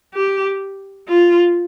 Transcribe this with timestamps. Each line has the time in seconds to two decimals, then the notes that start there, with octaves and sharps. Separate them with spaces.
0.14 G4
1.08 F4